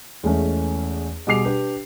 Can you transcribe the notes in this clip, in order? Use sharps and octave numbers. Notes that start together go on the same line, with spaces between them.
E2 G#3 A3 C#4
B2 G3 G#4 D6 C7 F7
D4 G4 B4